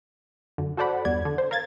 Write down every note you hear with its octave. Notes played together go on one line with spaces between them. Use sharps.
F#2 D3
F#4 A4 C5 D5 F#5 B5
E2 G2 D5 G#6
D3
C5
A#4 F5 G#6 A6